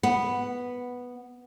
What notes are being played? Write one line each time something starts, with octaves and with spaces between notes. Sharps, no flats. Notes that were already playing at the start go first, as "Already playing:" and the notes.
B3